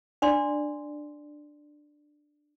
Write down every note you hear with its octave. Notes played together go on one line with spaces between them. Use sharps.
D4 D5 C6